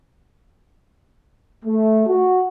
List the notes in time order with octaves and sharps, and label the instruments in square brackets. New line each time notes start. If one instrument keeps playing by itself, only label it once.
[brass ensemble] A3
F#4